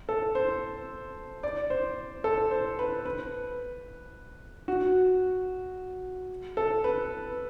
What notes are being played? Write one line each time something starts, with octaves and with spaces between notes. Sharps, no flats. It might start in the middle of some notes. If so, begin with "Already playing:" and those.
A4
C5
D5
C5
A4
C5
B4
B4
F#4
A4
B4